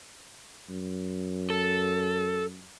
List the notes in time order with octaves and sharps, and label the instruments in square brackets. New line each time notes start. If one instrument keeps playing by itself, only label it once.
[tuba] F#2
[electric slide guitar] A4